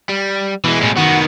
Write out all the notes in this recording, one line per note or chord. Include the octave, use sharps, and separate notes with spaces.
G3
B2 E3 G#3
A2 C#4
D#3 B3 F#4